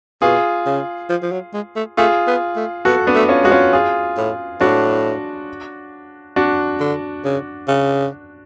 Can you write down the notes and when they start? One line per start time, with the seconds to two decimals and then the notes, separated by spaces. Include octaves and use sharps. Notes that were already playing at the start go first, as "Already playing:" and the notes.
0.22 B2 F4 G#4
0.66 C#3
1.09 F3
1.22 F3
1.32 F#3
1.54 G#3
1.76 A3
1.97 A3 F4 G#4
2.27 B3
2.56 A3
2.85 B3 F#4 A4
3.07 B3 D4
3.15 A3
3.29 C#4 F4
3.44 G#3 F#4
3.51 C#4 F4
3.73 F4 G#4
4.17 A2
4.61 A2 D4 F#4
6.36 D4 F#4
6.80 D3
7.25 C#3
7.68 C#3